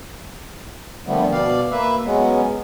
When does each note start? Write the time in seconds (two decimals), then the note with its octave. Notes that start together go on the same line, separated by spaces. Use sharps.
1.07 A#2 D3 F3 G3 A3 B3
1.32 B2 D5 F5
1.71 A#3 B4 E5
2.05 F#3 G#3 B3 C#4